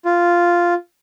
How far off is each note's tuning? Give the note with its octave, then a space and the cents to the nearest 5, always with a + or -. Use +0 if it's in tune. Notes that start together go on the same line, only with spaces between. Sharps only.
F4 -5